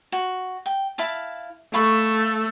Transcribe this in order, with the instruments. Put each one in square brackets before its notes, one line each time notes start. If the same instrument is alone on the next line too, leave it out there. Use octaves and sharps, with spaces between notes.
[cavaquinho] F#4
G5
E4 F5 A5
[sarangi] A3 [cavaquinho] F5 B5 C#6